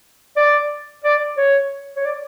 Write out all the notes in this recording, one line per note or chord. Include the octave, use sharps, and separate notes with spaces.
D5
D5
C#5
C#5
D5